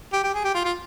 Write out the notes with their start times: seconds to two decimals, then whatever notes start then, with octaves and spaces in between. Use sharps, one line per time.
0.13 G4
0.24 G4
0.34 G#4
0.45 G4
0.54 F4
0.65 F4